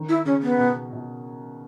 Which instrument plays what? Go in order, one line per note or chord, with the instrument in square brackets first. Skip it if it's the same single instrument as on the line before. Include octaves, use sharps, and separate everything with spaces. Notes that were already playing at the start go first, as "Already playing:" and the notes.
Already playing: [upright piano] D#3
[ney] E4
[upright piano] C#3 [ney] C#4
[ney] B3
[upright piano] B2
B2